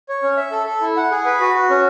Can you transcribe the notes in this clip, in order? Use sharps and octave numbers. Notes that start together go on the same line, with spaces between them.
C#5
C#4
E5
A4
A4
E4
F#5
G#4
B4
F#4
F#4
C#4